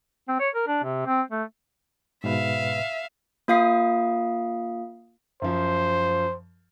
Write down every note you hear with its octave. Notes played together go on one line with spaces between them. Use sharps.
C4
C#5
A#4
D4
C3
C4
A3
G#2 B2 B4 E5 F5
A#3 F4 F5 D#6 C7
F#2 F3 C5